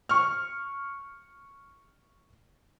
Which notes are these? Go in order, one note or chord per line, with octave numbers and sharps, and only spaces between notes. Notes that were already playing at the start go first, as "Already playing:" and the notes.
C#6 F6